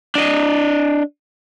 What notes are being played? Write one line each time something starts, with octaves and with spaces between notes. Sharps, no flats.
D4 D#5